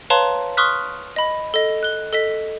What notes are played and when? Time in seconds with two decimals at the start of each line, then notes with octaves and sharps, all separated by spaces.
0.10 B4 C#5 F5 A5 A#5 C6
0.57 C6 C#6 D#6 F6 F#6 B6
1.16 D#5 B5
1.54 A4 D#5
1.83 F#6 G7
2.13 A4 D#5 B6